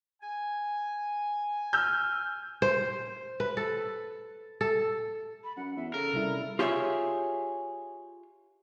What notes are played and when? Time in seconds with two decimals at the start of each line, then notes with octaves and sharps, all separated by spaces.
0.22 G#5
1.73 E6 F6 G6
2.62 C5
3.40 B4
3.57 A4
4.61 A4
5.44 B5
5.57 F#2 F#5
5.77 E2 E5
5.94 C#3 A4 A#4
6.13 C3 G3 E4
6.59 F4 G4 G#4 C#5 E5